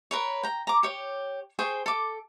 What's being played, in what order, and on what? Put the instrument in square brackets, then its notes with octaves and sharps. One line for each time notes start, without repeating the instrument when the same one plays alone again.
[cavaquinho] A#4 B4 C#5
G5 A#5
A#5 D6
G4 C#5
G#4 C5 G5 C#6
A4 D6